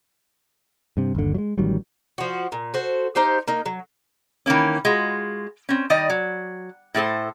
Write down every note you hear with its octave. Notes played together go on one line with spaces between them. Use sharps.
G2 C3
G1 D#2 D3
F#3 G#3
A1 D#3 F#3 G3
F3 F#4
A#2
F#4 A4 C5
D#4 G4 C5 F5
A#3 D#4
F#3
D#3 E3 A#3 C#4
G#3 F4 F#4
C4 C#4
D#3 G3 D5 D#5
F#3
A2 A3 A4 C5